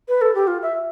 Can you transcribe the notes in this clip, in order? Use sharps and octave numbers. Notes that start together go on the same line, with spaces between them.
B4
A4
G4
F4
E5